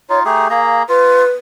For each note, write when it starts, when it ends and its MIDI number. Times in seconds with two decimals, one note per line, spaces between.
0.10 0.23 63
0.10 0.23 65
0.10 0.19 73
0.25 0.48 57
0.25 0.48 67
0.25 0.48 68
0.25 0.49 82
0.50 0.83 58
0.50 0.83 68
0.50 0.77 77
0.50 0.83 82
0.89 1.25 65
0.89 1.31 71